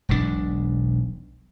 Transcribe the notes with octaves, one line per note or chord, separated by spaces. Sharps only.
E1 B1 A#2 D4